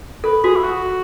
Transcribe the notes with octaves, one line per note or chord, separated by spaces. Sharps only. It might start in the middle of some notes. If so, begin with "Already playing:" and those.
A4 B4
F#4 G#4
E4
F#4